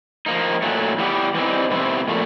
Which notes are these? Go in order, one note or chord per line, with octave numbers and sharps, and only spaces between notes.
F3 A#3 D#4
A#2 F#3 A3
E3 G3 B3 E4 G4
E3 G3 C4 D#4
B2 G3 C4 E4
A#2 F3 A3